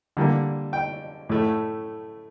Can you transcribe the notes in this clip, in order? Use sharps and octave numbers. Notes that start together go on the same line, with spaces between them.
D3 G3 A#3
G5
A2 A3